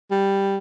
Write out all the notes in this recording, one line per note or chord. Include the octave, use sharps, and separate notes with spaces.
G3